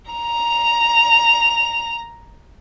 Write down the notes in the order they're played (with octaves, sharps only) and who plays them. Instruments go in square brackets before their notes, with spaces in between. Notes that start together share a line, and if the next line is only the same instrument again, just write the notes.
[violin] A#5 F7